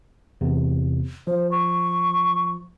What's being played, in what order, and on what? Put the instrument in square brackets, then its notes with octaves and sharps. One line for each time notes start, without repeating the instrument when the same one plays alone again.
[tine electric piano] E2 C3
[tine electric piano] F3 [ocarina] C5
[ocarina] C#6